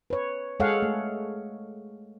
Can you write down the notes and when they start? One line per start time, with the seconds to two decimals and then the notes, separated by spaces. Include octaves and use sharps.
0.10 B4 C#5
0.60 G#3 G#4 A4 C#5 F5 F#5
0.82 A3